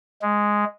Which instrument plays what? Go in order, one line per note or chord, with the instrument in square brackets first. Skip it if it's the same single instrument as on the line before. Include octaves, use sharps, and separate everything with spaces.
[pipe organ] G#3